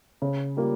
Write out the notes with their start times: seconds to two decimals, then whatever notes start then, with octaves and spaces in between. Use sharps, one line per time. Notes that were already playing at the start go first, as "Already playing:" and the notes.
0.22 C#3
0.57 G3 A#3 F4